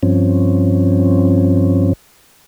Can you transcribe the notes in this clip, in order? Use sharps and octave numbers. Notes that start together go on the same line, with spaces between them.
G2 F3 C4 C#4